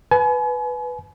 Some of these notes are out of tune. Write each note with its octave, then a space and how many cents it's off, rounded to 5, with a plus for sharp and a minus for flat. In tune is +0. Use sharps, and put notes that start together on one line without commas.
B4 +0 G#5 +40